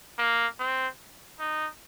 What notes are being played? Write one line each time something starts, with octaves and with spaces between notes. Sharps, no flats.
A#3
C4
D#4